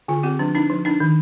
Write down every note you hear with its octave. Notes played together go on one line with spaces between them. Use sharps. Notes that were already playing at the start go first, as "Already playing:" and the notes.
D3 F4
C4 G4
F3 D4
D4 D#4
F3
D4 D#4
D#3